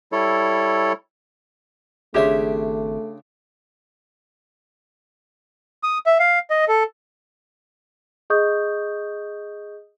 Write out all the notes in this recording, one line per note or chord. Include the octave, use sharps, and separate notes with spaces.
G3 E4 A4 C#5
G#1 C#3 A3 D4 G4 C#5 E5 C6
D#6
E5
F5
D#5
A4
G#4 D#5 C#6 D#6 G6